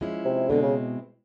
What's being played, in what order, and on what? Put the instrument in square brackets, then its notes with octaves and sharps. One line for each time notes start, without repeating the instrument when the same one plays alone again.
[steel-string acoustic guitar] F3 G#3 C#4 E4
[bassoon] C3
[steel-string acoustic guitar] B2 G#3 C4 E4 [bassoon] D3
[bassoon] C#3